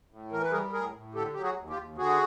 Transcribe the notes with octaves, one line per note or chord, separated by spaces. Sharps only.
A2
E3 A#4
B4
G3 G#4 A#4
A2 G#4 A#4
A2
D3 G4 A4
F#3 G4
F#4 G#4
D#2
F4 G4
D#2
D3 F#4 G#4